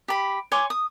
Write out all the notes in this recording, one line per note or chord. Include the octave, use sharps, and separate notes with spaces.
G4 B5
C#5 G#5 C6 D6
D#6